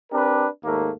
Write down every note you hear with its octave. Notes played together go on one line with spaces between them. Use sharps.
C4 D4 G4 A#4 B4
D#2 G#2 A3 A#3